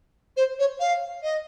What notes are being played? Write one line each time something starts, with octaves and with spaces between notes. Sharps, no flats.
C5
C#5
F5
D#5